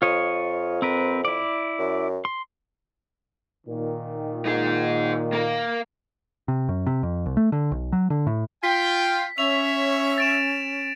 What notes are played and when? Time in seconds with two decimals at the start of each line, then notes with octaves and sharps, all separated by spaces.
0.02 F2 F4 C#5 D#5
0.82 C4 A#4 B4
1.25 E4 D5
1.79 F#2
2.25 C6
3.67 A#2 D#3
4.46 D#4 G#4
5.33 A#3 A#4
6.48 C3
6.69 F#2
6.87 C3
7.03 F2
7.26 C2
7.37 A3
7.52 D3
7.72 B1
7.92 F#3
8.10 D3
8.27 A2
8.64 F4 G5 B6
9.38 C#4 C#5 E5 F7
10.18 A6 D7 E7